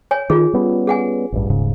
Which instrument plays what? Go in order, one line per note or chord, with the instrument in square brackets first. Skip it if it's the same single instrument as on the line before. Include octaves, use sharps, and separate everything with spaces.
[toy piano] C#5 G#5
[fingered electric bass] D#3 [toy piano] F4 G#4
[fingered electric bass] G3 B3 C#4
[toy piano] G#4 F#5 G#5
[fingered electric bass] A1 G2
D#1 G#2 C#3